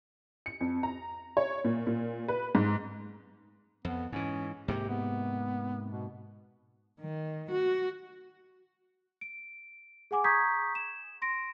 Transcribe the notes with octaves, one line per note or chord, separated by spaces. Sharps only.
C#7
F2
A#5
C#5
A#2
A#2
B4
G#2
F2 B3
G#2 E3 C#4
G#2 C3 A#3 G4
B3
B2
D#3
F#4
D7
G#4 F#5 G#5 D6
A#5 C#6 D#6 G6 G#6 B6
E7
C6 A#6 D7